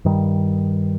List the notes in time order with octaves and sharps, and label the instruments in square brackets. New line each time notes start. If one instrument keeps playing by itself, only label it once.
[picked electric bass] G2 D#3 G3